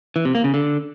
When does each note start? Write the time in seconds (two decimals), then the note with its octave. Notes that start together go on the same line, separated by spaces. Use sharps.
0.16 E3
0.25 C3
0.35 A#3
0.44 C#3
0.54 D3